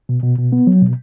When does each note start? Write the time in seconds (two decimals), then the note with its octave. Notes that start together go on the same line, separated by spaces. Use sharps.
0.09 B2
0.23 B2
0.38 B2
0.52 B3
0.67 F#3
0.82 B2